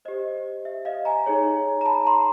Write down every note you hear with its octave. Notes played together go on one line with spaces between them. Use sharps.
G4 C5 D#5
E5
D#5 F5
G#5 A#5
D#4 G#4 C#5
A#5
A5 B5
A#5 C6